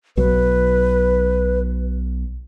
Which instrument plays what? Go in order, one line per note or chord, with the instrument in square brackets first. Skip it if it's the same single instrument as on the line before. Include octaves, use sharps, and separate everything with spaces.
[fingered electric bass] B1 F#3 [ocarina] B4